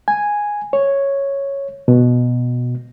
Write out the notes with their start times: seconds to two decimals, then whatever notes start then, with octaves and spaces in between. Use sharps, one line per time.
0.08 G#5
0.73 C#5
1.88 B2